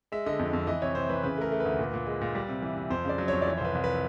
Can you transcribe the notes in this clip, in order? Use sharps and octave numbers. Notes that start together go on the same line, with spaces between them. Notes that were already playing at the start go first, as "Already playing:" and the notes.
G#3 E5
D3 D#5
F2
F2
E3 D#5
C3 C#5
C3 C5
E3 B4
C#3 B4
A3 A#4
A3
B4
D2
A#2
A#2
G#3
A#2
G3
C3
E3
C3
F2 C5
C#3 D5
F#3
F2 C#5
D5
E3 C#5
C5
C2 B4
C2
B4